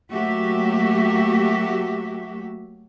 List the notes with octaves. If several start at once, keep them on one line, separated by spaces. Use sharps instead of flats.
F#3 A3 A#3 F#4 G4 E5